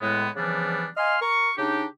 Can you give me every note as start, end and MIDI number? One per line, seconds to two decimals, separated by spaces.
0.01 0.28 45
0.01 0.28 56
0.01 0.28 59
0.36 0.86 49
0.36 0.86 52
0.36 0.86 53
0.36 0.86 55
0.36 0.86 59
0.36 0.86 62
0.97 1.16 75
0.97 1.16 77
0.97 1.16 80
0.97 1.16 84
0.97 1.16 89
1.21 1.51 70
1.21 1.51 85
1.56 1.85 49
1.56 1.85 62
1.56 1.85 63
1.56 1.85 67